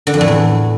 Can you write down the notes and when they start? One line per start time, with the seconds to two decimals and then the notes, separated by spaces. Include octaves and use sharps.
0.07 D3
0.14 F2
0.21 A2
0.28 E2